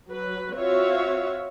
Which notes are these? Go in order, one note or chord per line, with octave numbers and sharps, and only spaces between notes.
F#3 B4
C4 F4 F#4 C#5 E5 F5